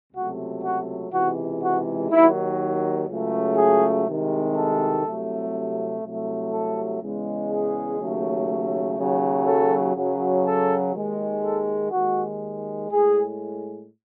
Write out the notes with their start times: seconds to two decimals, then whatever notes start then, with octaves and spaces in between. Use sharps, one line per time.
0.13 C#2 C3 F#3 A3 F#4
0.62 F#4
1.11 C#2 C3 E3 G#3 F#4
1.60 F#4
2.09 D#2 D#3 F#3 E4
3.08 C#2 C#3 F#3 A3
3.57 G#4
4.06 C2 C3 D#3 G#3
4.55 A4
5.04 C2 C3 F#3 A3
6.02 C2 C3 F#3 A3
6.51 A4
7.00 E2 C#3 G#3
7.49 G#4
7.99 D#2 C#3 F#3 A3
8.97 D#2 C#3 F#3
9.46 A4
9.95 F#2 C#3 F#3
10.44 A4
10.93 D#2 D#3 G#3
11.42 A4
11.91 D#2 D#3 G#3 F#4
12.90 A2 G#3 G#4